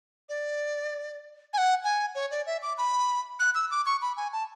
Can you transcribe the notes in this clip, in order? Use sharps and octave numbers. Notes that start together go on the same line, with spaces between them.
D5
G#5
F#5
G#5
C#5
D5
E5
D6
B5
F#6
E6
D6
C#6
B5
G#5
A5